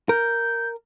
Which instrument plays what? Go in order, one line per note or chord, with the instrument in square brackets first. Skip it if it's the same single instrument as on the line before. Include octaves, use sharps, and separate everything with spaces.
[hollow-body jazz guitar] A#4 [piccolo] G6